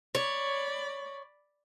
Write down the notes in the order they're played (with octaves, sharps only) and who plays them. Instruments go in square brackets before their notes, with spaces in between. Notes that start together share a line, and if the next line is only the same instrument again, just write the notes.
[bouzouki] C#5 [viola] D5 B5